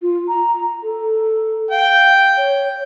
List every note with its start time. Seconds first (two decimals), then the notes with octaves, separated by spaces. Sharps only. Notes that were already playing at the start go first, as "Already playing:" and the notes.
0.02 F4
0.28 A#5
0.83 A4
1.71 F5 G5
2.37 C#5